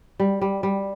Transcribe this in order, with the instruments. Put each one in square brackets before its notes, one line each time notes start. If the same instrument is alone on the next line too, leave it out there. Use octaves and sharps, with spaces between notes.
[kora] G3
G3
G3